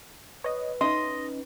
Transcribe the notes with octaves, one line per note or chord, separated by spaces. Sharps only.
B4 C#5 D#5
C#4 D#4 D#5 C6